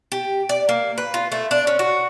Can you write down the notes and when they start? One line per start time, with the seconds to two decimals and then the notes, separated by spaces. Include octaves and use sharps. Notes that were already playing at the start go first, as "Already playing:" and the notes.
0.12 G4
0.49 D5
0.69 A#3
0.98 B4
1.14 F4
1.32 A3
1.51 D4
1.67 C#4
1.79 F#4